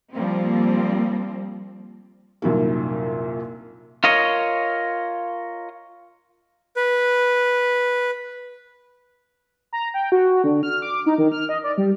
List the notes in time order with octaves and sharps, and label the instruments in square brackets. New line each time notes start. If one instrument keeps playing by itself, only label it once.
[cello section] F3 G3 A#3 C4
[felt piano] C2 F#2 A#2 D#3 A#3
[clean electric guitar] F4 A#4 C#5 D#5
[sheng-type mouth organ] B4
[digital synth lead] A#5
G5
F#4
D3
F6
D6
D#4
D#3
F6
D#5
D5
G3